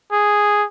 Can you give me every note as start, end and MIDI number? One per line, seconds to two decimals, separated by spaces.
0.12 0.65 68